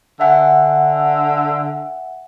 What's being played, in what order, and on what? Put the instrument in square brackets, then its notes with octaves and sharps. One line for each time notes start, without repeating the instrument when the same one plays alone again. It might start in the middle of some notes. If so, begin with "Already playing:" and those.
[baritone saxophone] D3 [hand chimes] E5 F#5 G#5